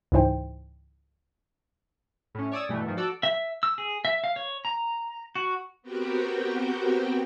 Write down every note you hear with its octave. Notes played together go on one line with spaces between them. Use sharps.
C#2 G#2 E3 D#4 C5 G5
A2 C#4
C#5 D5 D#6 E6
G2 B2 E3 A3
G#2 D#3 F3
F#4 A4 D5 E6
E5
E6
G#4
E5
F5
C#5
A#5
F#4
B3 C4 F#4 G4 A#4 G5